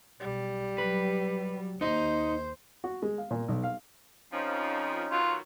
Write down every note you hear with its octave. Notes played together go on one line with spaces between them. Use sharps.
B1 G3
F#3 B4
D#2 D#4 C5 D#5
F#4
G#3
F5
A#2
B1
F5
F2 F3 C#4 D#4
B2 D#3 F#3 F4